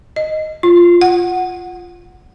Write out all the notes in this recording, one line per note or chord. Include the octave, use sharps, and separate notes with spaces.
D#5
F4
F#5